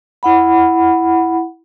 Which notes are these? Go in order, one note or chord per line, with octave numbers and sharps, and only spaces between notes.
E4 F#5 B5